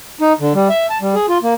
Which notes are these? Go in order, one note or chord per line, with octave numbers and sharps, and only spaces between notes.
D#4
D3
G3
E5
A5
G3
G#4
F4
A#3